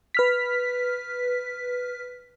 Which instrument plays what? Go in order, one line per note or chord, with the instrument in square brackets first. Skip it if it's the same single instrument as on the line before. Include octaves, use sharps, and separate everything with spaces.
[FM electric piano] B4 F6 B6